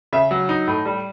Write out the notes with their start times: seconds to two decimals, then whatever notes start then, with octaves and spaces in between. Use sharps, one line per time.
0.13 C#3 E5
0.31 F#3
0.49 D#4
0.68 A2
0.85 G3